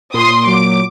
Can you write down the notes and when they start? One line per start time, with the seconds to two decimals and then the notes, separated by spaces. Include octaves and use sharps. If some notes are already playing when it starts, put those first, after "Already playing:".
0.14 A#2 C6 D#6
0.46 F#3 D6